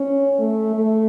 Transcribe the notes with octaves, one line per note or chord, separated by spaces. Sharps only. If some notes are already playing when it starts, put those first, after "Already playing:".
Already playing: C#4
A3
A3